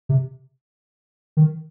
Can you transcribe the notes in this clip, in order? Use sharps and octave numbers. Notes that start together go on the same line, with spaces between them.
C3
D#3